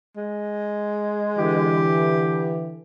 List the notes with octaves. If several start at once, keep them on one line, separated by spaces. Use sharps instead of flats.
G#3
D3 E3 G4